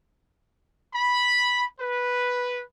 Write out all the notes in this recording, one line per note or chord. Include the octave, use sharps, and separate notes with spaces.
B5
B4